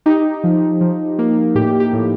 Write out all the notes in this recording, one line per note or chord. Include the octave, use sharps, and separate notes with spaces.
D#4 G4
F3
F3
A#3
A2 G4
G4
A2